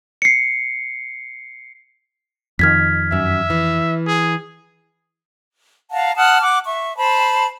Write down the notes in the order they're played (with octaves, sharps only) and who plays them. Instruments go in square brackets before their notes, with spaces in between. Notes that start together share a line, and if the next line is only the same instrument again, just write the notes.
[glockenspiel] C7 C#7
[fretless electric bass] F2 D#3 [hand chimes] F6 G#6 B6
[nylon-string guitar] F#2 [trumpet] E5
[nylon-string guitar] E3
[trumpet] G#4
[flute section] F5 F#5 A5 A#5
F#5 A5 D#6 F6
F#5 D6
E5 C#6
C5 A5 B5